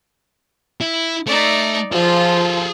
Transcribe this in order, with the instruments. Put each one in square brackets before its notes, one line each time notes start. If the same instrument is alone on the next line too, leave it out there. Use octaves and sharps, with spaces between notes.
[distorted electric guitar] E4
[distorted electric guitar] A3 [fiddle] D#4 D5
[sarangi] F3 [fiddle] F4 [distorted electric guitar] G#4 A4